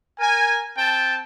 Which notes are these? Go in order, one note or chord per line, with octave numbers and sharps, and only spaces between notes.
A#4 G#5
C4 G5 A5